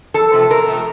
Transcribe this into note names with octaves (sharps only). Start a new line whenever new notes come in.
F2 A4
C3 F3 A3
F2 A#4
C3 F3 A3